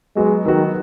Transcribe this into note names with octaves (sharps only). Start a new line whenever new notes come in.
F#3 G#3 B3 F#4
D#3 F#3 B3 F#4